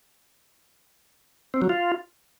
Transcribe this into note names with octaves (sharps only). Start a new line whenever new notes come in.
C4
F#3
F4